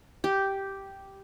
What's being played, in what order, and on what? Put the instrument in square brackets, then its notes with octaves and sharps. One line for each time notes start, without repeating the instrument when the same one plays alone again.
[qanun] G4